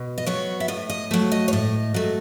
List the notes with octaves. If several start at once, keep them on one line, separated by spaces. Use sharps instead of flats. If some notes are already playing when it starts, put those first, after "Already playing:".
Already playing: B2
D#5
F#3 B3 C#5
E5
A2 D#5
D#5
F#3 A3
D#5
C#5
A2 D#5
F#3 A3